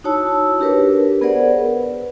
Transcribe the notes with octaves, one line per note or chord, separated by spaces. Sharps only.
D#4 E4 F#4 C#5 A5 E6
D4 G4 A#4 B4 C#5
B3 G#4 A#4 C5 D5 F#5
B4